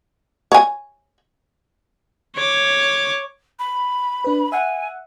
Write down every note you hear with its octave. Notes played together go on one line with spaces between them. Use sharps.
C#5 G#5
C#5 D6
B5
D4 B4
E5 F#5 G#5